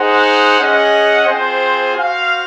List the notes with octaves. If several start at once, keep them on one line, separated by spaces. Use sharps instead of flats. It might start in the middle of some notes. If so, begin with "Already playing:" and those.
Already playing: D#4 G#4 C5 F#5
C#4 G#4 D#5 F#5
C4 F4 G#4 C5
F#4 C5 F5